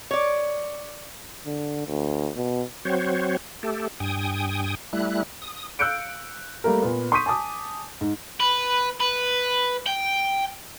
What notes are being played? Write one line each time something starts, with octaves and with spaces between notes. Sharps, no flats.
C#5 D5
D3
D2
B2
F#3 C4 F#4 C5 C#5
A3 G4 A4
G2 G5 G#5 D#6
G3 A3 E4 F#6
D#6
F5 E6 F#6 G6 C#7 D7
G3 A3 A#3 A#4
A#2 B3
C6 C#6 D#6 G6 B6 D#7
G#5 A5 D6 D#6
G#2
B4
B4
G5